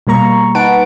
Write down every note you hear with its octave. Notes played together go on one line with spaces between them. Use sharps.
B2 G3 A#3 A#5 C#6
D#4 B4 F#5 A5 D7